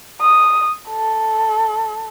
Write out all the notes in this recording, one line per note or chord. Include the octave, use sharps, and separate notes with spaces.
D#6
A4